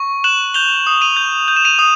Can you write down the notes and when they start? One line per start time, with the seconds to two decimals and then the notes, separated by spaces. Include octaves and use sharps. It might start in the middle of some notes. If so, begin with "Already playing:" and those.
Already playing: C#6
0.24 F#6 E7 F#7
0.54 G6 F7 G7
0.87 D#6
1.01 D#7 F7
1.16 G6
1.48 G6 F7
1.56 E7
1.65 D#7 F7
1.79 D#6